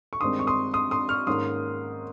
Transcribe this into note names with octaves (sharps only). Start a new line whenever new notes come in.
C#6
G2 D#3 G#3 C4 C6 D#6
C#6
C6 D#6
C6 D#6
C6 D#6
C#6 F6
G#2 D#3 A#3 C#4 C6 D#6